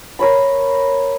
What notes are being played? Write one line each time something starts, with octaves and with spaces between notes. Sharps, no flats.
A#4 C#5 B5